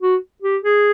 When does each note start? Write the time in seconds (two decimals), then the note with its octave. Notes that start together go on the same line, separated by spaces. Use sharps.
0.01 F#4
0.43 G4
0.64 G#4